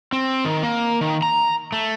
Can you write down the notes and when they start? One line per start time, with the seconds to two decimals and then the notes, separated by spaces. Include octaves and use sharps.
0.12 C4
0.45 D#3
0.63 A#3
1.01 D#3
1.22 A#5
1.72 A3